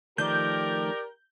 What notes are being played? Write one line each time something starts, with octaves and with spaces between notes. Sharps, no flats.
D#3 F3 A3 G4 A#4 D5 G6